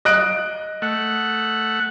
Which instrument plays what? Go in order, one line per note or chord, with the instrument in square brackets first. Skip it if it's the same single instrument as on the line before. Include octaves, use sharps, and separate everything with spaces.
[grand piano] D#5 F#6 D7
[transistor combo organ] A3 F#5